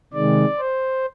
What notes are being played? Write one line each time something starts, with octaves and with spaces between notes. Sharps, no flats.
C3 D#3 G#3 D5
C5